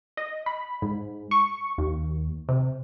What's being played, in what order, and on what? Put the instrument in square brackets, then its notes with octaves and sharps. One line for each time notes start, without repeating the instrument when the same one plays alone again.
[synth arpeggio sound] D#5
B5
G#2
C#6
D#2
C3